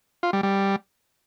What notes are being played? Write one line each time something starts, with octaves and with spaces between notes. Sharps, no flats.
F4
G3
G3